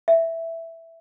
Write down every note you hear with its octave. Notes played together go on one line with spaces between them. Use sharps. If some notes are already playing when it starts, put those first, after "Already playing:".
E5